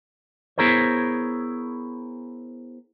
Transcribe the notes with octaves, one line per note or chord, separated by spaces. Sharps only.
B3 E4 G#4 A#4 C5 C#5